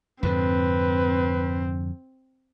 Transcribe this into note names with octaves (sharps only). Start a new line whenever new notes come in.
F2 G#2 D3 C4 B4